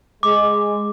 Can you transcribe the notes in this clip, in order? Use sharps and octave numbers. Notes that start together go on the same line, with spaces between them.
G#3 D6